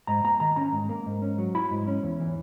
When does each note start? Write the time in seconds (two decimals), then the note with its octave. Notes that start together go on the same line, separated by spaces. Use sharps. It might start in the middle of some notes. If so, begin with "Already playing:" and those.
0.07 G#2 A#5
0.24 A#3 A#5
0.40 D#3 A#5
0.56 C#4 A#5
0.73 G#2
0.89 A#3
1.06 G#2
1.22 C#4
1.38 F#3
1.55 E4 B5
1.71 G#2
1.87 C#4
2.03 E2
2.20 E3